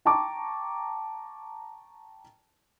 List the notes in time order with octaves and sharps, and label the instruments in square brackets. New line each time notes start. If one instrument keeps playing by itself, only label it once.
[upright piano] G5 A5 A#5 C#6 D6